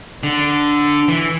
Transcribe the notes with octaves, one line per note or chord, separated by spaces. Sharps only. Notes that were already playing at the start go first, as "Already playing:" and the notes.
D3
E3